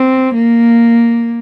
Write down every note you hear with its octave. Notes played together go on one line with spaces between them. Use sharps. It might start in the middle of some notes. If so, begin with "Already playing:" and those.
Already playing: C4
A#3